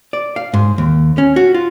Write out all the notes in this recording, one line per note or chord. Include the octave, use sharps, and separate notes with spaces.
D5
F5
G#2
D#2
C#4
F#4
F4